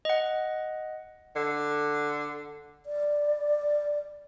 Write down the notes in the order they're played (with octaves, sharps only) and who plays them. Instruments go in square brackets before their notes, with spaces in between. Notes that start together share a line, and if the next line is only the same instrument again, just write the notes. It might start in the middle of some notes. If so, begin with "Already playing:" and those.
[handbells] D#5 F#5
[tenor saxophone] D3
[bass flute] D5